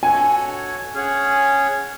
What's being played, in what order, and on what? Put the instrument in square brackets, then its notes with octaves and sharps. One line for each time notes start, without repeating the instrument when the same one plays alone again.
[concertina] F#4 A4 C#5 F#5 [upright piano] G#5
[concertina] C#4 G#4 C#5 F#5